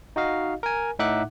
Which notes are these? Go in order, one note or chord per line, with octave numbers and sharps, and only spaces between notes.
D#4 F#4 D#5 F5
A#4 G#5
A2 D#4 E5 F#5 D6 F#6